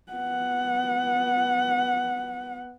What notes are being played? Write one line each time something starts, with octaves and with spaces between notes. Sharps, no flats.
B3 F#5